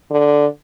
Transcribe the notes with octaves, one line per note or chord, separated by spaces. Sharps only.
D3